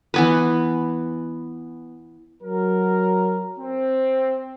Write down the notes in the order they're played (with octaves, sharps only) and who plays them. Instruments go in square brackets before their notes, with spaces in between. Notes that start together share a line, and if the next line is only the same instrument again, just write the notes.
[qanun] E3 B3 B4
[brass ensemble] F#3 A#4
C4